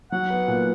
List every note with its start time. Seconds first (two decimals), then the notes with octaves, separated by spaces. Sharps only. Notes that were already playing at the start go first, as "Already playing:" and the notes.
0.12 F#3 F#5
0.30 B3
0.48 A#2